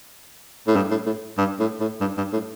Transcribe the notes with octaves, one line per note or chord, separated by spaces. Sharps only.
A2
G2
A2
A2
G2
A2
A2
G2
G2
A2